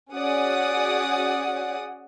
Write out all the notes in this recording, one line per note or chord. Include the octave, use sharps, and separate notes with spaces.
C#4 F#4 G#4 D5 F#5 D#6